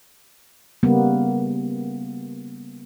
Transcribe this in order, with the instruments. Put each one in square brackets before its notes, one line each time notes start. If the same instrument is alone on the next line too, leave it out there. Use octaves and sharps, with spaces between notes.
[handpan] C#3 G3 A#3 B3